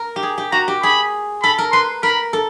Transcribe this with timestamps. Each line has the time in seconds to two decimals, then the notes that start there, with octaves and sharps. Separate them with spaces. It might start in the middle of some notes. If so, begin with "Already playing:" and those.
Already playing: A#4
0.16 G4
0.23 G#4
0.38 G4
0.52 F#4 A#5
0.68 G4
0.83 G#4 B5
1.43 A4 B5
1.58 A#4
1.73 B4 C6
2.03 A#4 B5
2.33 A4